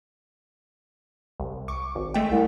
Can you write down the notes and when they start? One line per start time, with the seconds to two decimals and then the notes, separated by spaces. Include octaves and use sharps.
1.40 C2
1.68 C#6 D6
1.95 G#1
2.14 G#3 A3 G5
2.31 C2